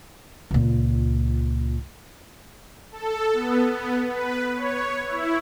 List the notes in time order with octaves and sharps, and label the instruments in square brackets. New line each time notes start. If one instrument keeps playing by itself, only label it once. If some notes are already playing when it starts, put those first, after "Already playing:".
[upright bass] C#2 A#2
[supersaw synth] A4
B3
B3
B4
C#5
E4